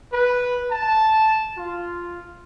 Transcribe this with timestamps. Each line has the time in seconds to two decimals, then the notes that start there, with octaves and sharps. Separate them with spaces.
0.12 B4
0.72 A5
1.57 F4